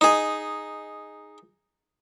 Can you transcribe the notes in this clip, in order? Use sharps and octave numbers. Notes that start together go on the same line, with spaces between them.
D#4 G#4